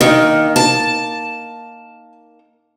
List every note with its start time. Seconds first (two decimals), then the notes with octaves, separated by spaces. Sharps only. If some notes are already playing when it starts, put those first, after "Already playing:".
0.01 D#3 A#3 D#4
0.56 A5